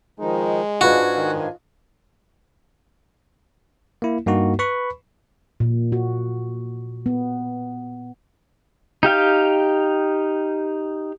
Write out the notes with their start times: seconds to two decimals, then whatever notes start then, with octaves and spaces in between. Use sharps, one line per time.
0.20 D#3 F3 G#3 D#4
0.81 G#2 D4 F4 F#4 B4 D#5 G#5
1.17 D#3
4.02 A#3 E4
4.26 G2 A#3 D#4 F#4
4.59 B4 B5 C#6
5.60 A#2
5.92 F#4
7.06 B3
9.03 D#4 G4 F5 G5